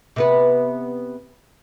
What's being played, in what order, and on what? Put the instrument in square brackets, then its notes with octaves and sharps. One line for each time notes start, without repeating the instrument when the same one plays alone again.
[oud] C3 B3 B4